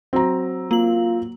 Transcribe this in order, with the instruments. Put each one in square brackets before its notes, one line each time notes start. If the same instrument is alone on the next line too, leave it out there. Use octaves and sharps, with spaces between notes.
[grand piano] F#3 [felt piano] C4 A#5
[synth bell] A#3 F#7 [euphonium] F4